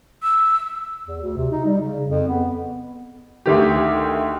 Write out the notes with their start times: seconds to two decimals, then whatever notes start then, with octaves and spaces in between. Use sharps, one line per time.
0.23 E6
1.06 E2
1.21 D2
1.37 C3
1.51 D#4
1.65 G3
1.80 C#3
2.07 F2
2.28 B3
3.46 D2 D#3 G4